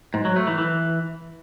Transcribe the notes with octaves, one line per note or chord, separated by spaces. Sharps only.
G#2
F#3
A3
E3
E3